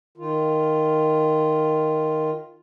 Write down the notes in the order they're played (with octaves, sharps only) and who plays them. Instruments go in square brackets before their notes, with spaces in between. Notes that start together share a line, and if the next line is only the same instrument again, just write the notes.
[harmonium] D#3 F4